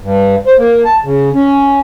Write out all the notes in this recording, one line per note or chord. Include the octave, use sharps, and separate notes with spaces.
G2
C5
A#3
A5
C#3
C#4